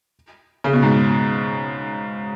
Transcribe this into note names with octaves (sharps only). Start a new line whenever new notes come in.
C#3
B2
G#2